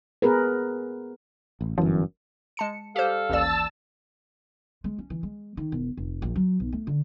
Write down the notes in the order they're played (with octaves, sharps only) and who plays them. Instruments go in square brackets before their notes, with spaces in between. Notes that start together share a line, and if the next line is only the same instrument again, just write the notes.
[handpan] B3 G#4 A#4 B4
[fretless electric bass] A1
[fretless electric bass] G1 F#2 [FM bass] E3
[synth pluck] G#3 A5 C#7
[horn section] G3 A4 F5 [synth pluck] G4 C5
[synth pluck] A1 D#2 D5 [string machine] A5 E6
[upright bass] G#3
C#4
E3
G#3
D#3
E1
F1
A#1
F#3
B1
A3
D3